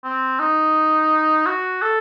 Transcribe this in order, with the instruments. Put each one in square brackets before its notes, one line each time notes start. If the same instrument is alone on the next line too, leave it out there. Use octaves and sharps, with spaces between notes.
[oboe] C4
D#4
F#4
A4